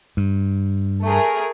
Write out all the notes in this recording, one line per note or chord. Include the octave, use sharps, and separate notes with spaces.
G2
A3 G#4 A#4